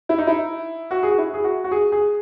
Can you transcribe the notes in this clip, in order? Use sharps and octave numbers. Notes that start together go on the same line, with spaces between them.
E4
D#4
E4
F#4
G#4
F#4
E4
G#4
F#4
F#4
G#4
G#4